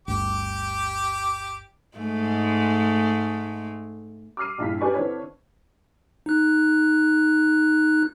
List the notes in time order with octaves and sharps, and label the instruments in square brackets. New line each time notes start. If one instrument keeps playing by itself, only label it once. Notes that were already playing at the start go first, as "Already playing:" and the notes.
[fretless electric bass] G1 D2 G2 [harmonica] G4 D6
[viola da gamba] G#2 G#3 A3
[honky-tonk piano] D6 E6 F6 C7 D#7
A#1 G2 E4 B6
D4 G4 B4 D5 G#5 C#6
D3 C4 D4 E4 B4 C#5
[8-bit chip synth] D#4 F#6